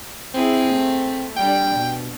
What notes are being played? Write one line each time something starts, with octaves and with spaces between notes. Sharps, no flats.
C4 E4 G#4
A3
G3 D4 G5
B2